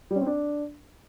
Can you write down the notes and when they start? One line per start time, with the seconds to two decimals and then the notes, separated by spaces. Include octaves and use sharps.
0.11 G3
0.16 C#4
0.21 C4
0.26 D4